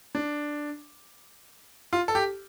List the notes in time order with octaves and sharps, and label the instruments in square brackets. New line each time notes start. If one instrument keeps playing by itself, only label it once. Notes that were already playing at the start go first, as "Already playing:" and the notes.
[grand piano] D4
F4
A4
G4